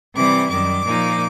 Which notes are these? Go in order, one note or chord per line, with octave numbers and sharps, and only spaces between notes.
C3 E3 G3 D6
F#2 D#3 G3 D6
A#2 F3 A#3 D#4